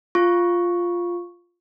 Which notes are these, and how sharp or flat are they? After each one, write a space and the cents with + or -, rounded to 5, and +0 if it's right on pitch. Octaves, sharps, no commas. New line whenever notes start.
F4 +0 C#6 +0